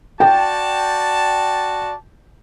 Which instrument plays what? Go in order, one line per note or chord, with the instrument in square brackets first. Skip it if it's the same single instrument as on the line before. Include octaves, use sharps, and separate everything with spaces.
[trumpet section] F#4 D5 A5 [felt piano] G5